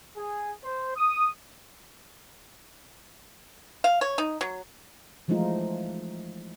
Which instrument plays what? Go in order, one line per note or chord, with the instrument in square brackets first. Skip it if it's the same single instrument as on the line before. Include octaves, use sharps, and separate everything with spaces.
[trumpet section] G#4
C5
D#6
[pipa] F5
C#5
D#4
F#3
[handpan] E3 F3 G#3 A3 D#4 F4